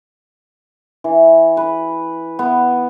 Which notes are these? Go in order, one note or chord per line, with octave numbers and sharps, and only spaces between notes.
E3
B4
B3